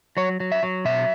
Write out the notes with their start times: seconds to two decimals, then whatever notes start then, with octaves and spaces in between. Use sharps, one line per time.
0.17 F#3 C#5
0.40 F#3
0.52 E5
0.63 F#3
0.85 B2 E5